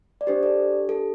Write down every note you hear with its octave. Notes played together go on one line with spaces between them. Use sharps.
D5
D4 G4 C5
A4 D5
A4